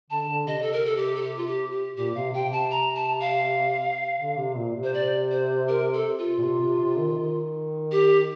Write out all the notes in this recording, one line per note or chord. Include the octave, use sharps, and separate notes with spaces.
D3 A5
D3
C3 D#5
A4
A#4
A4
G4
A4
G4
F4
G4
G4
A#2 G4
C3 F5
C3 G5
C3 A5
A#5
A5
F5
D3
C3
A#2
C3
C5
D5
C5
A#4
A4
F4
A#2
C3
C3
C3
D#3
D#3
G4